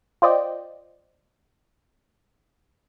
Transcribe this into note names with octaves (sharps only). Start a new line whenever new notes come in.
F4 C5 D5 D#5 G5